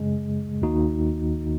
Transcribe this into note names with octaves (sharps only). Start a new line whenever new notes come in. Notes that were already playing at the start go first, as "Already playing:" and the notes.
Already playing: F#2 C#3 G#3
D#2 D#3 A#3 D#4 F#4